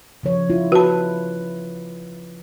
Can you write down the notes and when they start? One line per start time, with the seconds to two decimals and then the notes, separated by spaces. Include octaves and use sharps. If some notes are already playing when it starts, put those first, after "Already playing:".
0.23 C#3 F3 C#5
0.50 E4 F4
0.72 F#4 B4 A5